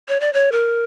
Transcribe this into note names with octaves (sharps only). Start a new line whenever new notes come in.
C#5
D5
C#5
A#4